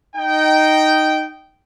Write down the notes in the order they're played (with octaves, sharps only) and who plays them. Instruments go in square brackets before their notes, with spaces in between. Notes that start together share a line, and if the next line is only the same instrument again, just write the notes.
[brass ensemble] D#4 G5